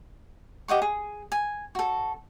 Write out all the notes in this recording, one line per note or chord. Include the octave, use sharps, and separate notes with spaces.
G4 D#5 F#5 C#6
G#4
G#5
F#4 A4